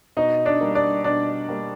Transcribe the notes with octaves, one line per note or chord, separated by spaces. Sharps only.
B2 D#4 D#5
D4 D5
G3 A#3
D4 D5
B2 D4 D5
G3 A#3